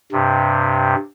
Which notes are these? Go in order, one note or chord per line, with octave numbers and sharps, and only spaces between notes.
G2 C3